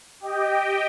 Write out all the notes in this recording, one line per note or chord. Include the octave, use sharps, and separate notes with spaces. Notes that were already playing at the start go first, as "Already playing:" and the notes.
G4 D#5 G5